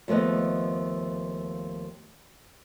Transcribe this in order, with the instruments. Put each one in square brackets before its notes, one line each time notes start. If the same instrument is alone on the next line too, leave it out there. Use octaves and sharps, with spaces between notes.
[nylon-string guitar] D#2 F3 A3 B3 D#5